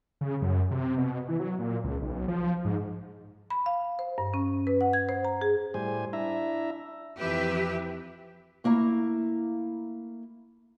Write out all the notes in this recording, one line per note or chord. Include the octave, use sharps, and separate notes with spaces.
C#3
F#2
C3
B2
E3
F#3
A#2
C#2
B1
F3
G#2
B5
F5
C5
G2
C#4
B4
F#5
G#6
C5
A#5
G#4
A2 G3 C5 G#5
D4 E4 E5 A#5
F2 E3 G4 B4 E5
A3 A#3 E4 A#5